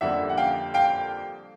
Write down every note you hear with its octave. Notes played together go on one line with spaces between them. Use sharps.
F2 D3 G3 A#3 E5 F#5
F#5
F5 G5
F5 G5